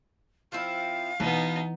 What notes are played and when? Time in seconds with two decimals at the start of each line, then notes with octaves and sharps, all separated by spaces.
0.52 F3 C4 E4 F5
1.20 B2 E3 B3 D#4